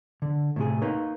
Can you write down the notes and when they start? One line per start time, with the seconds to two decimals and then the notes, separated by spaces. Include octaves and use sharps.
0.22 D3
0.56 A2 C3 G#4
0.82 A#3 D#4 B4 C#5